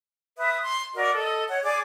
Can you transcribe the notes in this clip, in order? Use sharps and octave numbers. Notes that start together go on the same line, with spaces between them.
B4 E5 D#6
C6
F#4 A#4 D5 D#5
A4 D#5
C#5 F#5
G#4 D5 D6